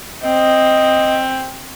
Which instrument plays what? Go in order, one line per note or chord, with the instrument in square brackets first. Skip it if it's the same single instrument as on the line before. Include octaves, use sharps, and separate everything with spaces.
[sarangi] C4 [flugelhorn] D#5